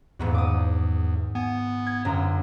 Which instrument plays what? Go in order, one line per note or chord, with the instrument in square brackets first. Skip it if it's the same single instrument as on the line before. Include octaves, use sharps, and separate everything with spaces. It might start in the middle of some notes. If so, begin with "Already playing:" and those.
[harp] D#1 G#2 F#4 [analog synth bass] E2
[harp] D6 D#6
[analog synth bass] B3 [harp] G#5
[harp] G#6
G1 F#2 A#5